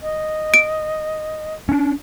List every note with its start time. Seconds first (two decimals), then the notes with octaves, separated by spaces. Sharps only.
0.02 D#5
0.54 D7
1.69 C#4 D4